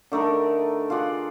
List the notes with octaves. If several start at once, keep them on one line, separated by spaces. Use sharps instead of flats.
D3 A3 D#4 A#4
F4 G#4 D5 F#5